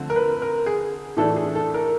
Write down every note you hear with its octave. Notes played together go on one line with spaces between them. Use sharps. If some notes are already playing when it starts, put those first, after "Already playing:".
Already playing: D3 F3 A3 C4
A#4
B4
A#4
G#4
A2 E3 A3 D4 A4
G#4
A4
A#4